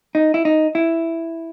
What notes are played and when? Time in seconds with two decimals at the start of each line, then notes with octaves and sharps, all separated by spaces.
0.15 D#4
0.34 E4
0.45 D#4
0.75 E4